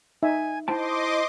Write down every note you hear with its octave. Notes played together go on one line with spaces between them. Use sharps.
D#4 E5 G#5
E4 C5 D#5 G5 A5 C6 D6